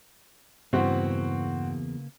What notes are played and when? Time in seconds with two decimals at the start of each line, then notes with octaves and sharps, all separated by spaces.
0.73 E2 G2 C#3 A#3 C4 F#4 B4